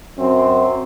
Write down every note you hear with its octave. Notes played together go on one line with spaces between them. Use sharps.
F#2 C4